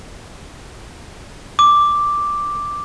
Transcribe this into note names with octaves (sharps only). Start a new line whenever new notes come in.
D6